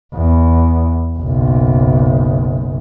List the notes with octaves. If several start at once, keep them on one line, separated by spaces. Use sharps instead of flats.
E2
F#1 B1